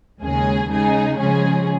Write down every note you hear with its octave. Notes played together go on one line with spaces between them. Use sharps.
D#2 C#3 G#3 C#4 G#4
C#3 G#3 D#4 G#4
C#3 F3 G#3 C#4 G#4